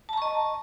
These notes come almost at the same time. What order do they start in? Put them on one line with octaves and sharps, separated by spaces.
A5 A#5 C#6 D#5